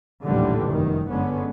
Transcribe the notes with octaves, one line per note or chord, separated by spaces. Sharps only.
A#1 D#2 A2 D3 E3 G3
F1 F#2 B2 D#3
G1 D3 G#3 B3 C#4